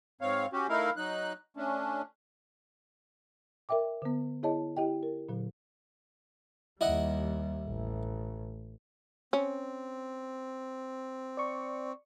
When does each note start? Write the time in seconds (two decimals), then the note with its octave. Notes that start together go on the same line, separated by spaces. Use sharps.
0.21 G#2 C4 C#5 F5
0.53 C#4 F#4 G4
0.69 A3 D#4 E4 A#4 F5
0.97 F#3 D#4 F#6
1.57 A3 C#4 D4
3.69 A#4 D5 E5 G5 D6
4.02 D3 B3
4.43 E4 G#4 C#5 D#5 A5
4.77 E4 G4 D#5 G5
5.03 A#4
5.29 A#2 D3 F#3
6.81 D#2 G3 E4 D#5 F#5
7.67 A1
9.33 C4 C#4
11.37 D5 C#6